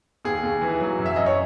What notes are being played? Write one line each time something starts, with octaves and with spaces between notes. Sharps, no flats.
D#2 G#4
D#2
E3
F#3
F#2
E5
F#2 D#5
C#5